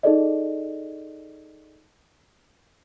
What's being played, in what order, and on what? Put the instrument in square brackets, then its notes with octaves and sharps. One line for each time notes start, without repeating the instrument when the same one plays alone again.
[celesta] D#4 G#4 A4 D5 D#5